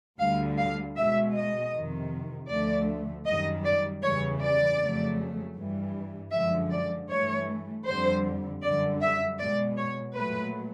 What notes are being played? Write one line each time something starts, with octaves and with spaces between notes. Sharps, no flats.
D2 D3 G3 F5
F5
B2 G#3 E5
D#5
F2 C3 D#3
D2 D3 F3 A3 D5
F#2 D#3 G3 D#5
D5
E2 C#3 E3 G3 C#5
D5
F2 C#3 F#3 A3
G2 E3 G3
F#2 D3 F3 G#3 E5
D5
G2 E3 A3 C#5
F2 D3 G3 C5
F#2 D3 G3 D5
E5
B2 G#3 D5
C#5
A#2 F#3 A3 B4